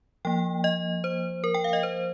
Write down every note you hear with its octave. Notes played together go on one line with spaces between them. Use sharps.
F3 A#3 G5
D#5
C5
A#4
G5
F5
D#5
C5